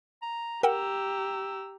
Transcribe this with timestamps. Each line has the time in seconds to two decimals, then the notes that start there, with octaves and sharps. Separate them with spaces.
0.22 A#5
0.63 G4 A#4 F#5 G5 A#5 E6